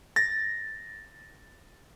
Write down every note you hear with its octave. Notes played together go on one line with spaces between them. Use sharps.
A6 A#6